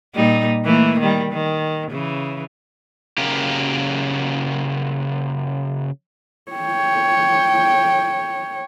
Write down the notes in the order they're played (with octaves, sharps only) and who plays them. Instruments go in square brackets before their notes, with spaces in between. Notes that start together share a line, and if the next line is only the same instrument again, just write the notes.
[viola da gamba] A#2 G3 D#4
E3 A3 A#3
D#3 G3
D#3
C#3 E3
[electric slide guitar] C#3 F#3 A#3 G4 A#4
[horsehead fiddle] C#5 G5